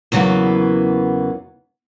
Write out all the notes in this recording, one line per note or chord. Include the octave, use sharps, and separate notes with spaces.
E2 C#3 E3 F#3 A#3 B3